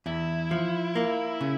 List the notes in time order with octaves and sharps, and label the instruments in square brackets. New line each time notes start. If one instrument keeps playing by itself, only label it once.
[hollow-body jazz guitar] E2 [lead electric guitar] E4
[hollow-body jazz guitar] F3
A#3
C#3